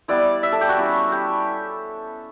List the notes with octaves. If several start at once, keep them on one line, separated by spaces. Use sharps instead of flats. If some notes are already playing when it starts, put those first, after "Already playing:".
G3 B3 E4 D5
E5
A4
G4
F#4
G3 C#4 E4
G4